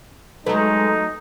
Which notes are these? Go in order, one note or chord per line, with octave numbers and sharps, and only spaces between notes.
F#3 G#3 A3 D#4 B4